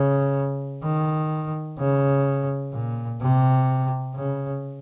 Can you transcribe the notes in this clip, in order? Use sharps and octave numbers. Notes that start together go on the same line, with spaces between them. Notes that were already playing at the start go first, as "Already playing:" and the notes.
Already playing: C#3
D#3
C#3
A#2
C3
C#3